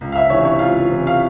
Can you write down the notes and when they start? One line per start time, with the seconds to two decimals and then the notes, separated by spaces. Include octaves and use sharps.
0.01 C#2
0.12 F5
0.16 E5
0.30 C3 E3 C#5
0.45 C#5
0.59 C#2 F4 F5
0.89 C3 E3
1.07 F5